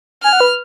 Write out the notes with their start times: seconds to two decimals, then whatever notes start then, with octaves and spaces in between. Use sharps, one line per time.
0.23 G#5 F6
0.33 F#5
0.41 B4